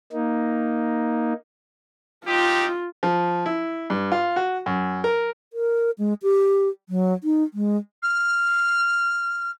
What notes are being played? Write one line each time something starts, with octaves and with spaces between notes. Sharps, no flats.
A#3 D#4
C4 D#4 F4 G4
F3
E4
G2
F4
F#4
F#2
A#4
A#4
G#3
G4
F#3
D#4
G#3
F6